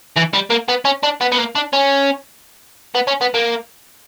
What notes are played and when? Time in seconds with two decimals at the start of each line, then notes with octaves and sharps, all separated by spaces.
0.16 E3
0.33 G3
0.50 A#3
0.68 B3
0.85 C#4
1.03 D4
1.21 B3
1.32 B3
1.38 A#3
1.55 D4
1.73 C#4
2.95 B3
3.07 C#4
3.21 B3
3.34 A#3